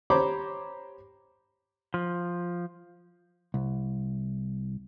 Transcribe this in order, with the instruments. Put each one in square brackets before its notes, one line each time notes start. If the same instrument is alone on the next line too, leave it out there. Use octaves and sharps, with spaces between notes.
[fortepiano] G4 C5 C#5 A#5 B5 D6
[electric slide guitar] F3
[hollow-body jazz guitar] C2